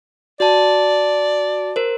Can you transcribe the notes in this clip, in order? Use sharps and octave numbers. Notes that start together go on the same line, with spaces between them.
F#4 D5 A5
A#4 C5